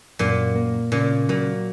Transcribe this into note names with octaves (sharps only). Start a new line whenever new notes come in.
F#2 A#2
A#3
A#2 C#3
A#2 F#3